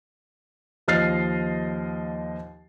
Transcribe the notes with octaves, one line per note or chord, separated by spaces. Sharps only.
D#2 F3 D#5 F6 A6 C7